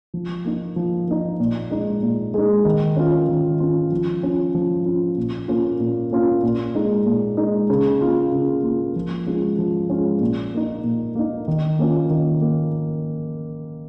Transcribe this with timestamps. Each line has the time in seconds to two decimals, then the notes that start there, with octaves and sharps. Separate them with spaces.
0.14 F3
0.45 A#3 D#4
0.76 F3
1.07 A#3 D#4
1.40 A#2
1.71 G#3 D#4
2.03 A#2
2.34 G#3 D#4
2.65 D#3
2.96 C#4 F4
3.28 D#3
3.60 C#4 F4
3.92 F3
4.23 C#4 F4
4.55 F3
4.86 C#4 F4
5.17 A#2
5.48 A#3 C#4 F4
5.80 A#2
6.11 A#3 C#4 F4
6.43 A#2
6.75 G#3 D#4
7.06 A#2
7.37 G#3 D#4
7.70 C#3
8.01 A#3 F4
8.32 C#3
8.63 A#3 F4
8.96 F3
9.26 G#3 C#4 F4
9.58 F3
9.90 G#3 C#4 F4
10.21 A#2
10.53 A#3 D#4
10.84 A#2
11.15 A#3 D#4
11.48 D#3
11.79 A#3 C#4 F4
12.10 D#3
12.41 A#3